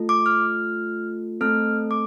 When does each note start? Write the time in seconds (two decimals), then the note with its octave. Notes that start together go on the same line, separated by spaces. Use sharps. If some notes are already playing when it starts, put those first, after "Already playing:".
Already playing: A3 F4 A4
0.09 D6
0.26 F6
1.41 A3 C4 A4 F6
1.91 D6